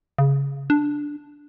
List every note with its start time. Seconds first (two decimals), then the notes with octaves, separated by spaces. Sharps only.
0.18 C#3
0.70 D4